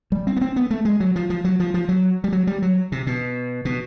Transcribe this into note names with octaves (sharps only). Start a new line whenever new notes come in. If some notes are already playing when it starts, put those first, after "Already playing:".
G3
C4
B3
C4
B3
A3
G#3
F#3
F3
F3
F#3
F3
F3
F#3
G3
F#3
G3
F#3
C3
B2
B2